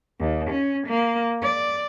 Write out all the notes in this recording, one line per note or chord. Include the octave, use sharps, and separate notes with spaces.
D#2
C#4
A#3
D5